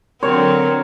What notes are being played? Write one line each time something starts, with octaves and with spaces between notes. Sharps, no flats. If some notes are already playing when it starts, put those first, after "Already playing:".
D3 F#3 C4 A#4 C#5